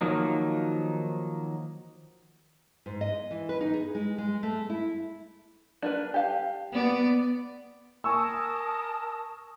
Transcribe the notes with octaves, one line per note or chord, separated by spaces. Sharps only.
D#3 F3 F#3 A#3 D#4
G#2
D#5
E3
B4
D#4
G#4
G#3
G#3
A3
E4
D4 A#4 B4
G4 F5 A5
B3 D5
A#4 G#5 A5 C#6 D#6 E6